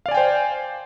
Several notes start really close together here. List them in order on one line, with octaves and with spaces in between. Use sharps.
F5 D5 G#5 G5 C5